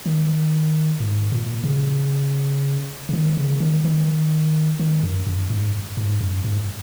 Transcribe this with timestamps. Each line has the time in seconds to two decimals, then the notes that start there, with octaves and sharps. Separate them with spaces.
0.06 D#3
1.00 G#2
1.32 A#2
1.64 C#3
3.09 C#3
3.13 D#3
3.37 C#3
3.60 D#3
3.84 D#3
4.80 D#3
5.03 F#2
5.27 F#2
5.50 G#2
5.97 G#2
6.21 F#2
6.44 G#2